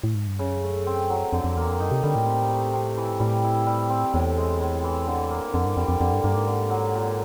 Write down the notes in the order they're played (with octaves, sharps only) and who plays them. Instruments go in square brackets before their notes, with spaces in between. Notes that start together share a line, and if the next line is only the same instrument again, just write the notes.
[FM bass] A2
G#2
G2
[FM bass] F#2 [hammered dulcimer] C#3
[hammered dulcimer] A3
C4
F#3
[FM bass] F2 [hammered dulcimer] D3
[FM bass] F2
[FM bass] E2 [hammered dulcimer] A#3
[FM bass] F2
[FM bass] F#2 [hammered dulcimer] D#4
[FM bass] C3
[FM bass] D3 [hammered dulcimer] G3
[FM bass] A2
[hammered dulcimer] C3
A3
C3
E3
[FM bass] G#2
[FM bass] A2 [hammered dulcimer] G3
[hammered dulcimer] E4
G3
C4
[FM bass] E2 [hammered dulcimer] A2
[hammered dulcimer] G#3
A2
E3
D3
A#3
[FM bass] F2 [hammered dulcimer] D3
[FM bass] G2
[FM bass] F2 [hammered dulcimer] G3
[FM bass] F2
[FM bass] F2 [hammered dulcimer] D3
[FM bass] G2
[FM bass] G2 [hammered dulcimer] A#3
[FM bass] G#2
[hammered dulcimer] D3
F#3
A#2